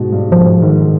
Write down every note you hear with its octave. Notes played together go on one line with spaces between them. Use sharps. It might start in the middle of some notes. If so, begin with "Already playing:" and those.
Already playing: G#2 B2
G2
G#2 F3
G#2 D#3